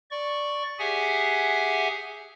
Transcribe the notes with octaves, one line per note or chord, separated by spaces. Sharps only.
D5 C#6
G4 G#4 E5 F#5 G#5